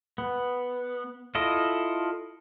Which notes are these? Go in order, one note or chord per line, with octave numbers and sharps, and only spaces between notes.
B3
E4 F4 A4 D#5